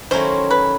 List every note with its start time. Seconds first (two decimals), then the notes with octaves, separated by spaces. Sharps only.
0.11 D#3 F#3 A3 C#4 E4 C5
0.51 B4